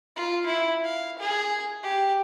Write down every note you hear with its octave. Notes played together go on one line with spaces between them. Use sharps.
F4
E4
F5
G#4
G4